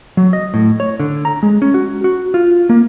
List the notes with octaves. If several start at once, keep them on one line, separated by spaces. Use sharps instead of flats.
F#3
D#5
A2
C#5
D3
A#5
G#3
C#4
F#4
F#4
F4
A#3